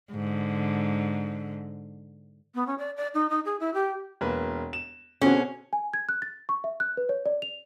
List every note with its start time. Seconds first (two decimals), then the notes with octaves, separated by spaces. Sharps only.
0.12 G#2 D3
2.55 B3
2.67 C#4
2.78 D5
2.97 D5
3.14 D#4
3.30 D#4
3.45 G#4
3.60 E4
3.74 G4
4.21 E1 A#3 B4
4.73 E7
5.21 B2 D3 C4 C#4 F#4 G#4
5.73 G#5
5.94 G#6
6.09 F#6
6.22 A6
6.49 C#6
6.64 E5
6.80 F#6
6.97 B4
7.09 C#5
7.26 D5
7.42 F7